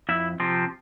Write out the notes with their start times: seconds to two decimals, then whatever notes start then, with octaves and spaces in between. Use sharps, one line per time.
0.09 F2 E4 E5
0.40 C3 F3 C4